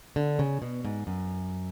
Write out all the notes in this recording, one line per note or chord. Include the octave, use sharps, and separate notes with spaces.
D3
C#3
B2
G#2
F#2